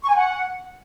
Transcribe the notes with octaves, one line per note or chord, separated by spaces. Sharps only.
C#6
G#5
F#5